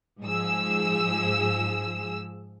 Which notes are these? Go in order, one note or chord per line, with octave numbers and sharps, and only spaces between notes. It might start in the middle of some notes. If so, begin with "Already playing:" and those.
G#2 F3 G#4 E6